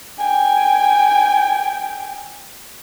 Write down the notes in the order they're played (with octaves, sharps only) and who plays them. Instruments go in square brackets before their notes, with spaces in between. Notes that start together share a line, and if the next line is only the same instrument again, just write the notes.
[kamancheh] G5 G#5